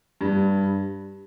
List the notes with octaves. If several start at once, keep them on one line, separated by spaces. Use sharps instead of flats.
G2